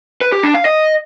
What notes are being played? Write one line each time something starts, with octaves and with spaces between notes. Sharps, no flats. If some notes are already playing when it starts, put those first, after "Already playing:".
B4
G4
D4
F5
D#5